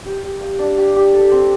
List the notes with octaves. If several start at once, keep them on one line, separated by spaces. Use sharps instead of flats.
G4
G4
F5
D4
G4
G4
A4
C4